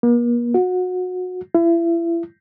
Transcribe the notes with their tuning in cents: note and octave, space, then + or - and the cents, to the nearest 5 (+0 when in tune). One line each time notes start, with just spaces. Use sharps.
A#3 +45
F#4 -25
E4 +35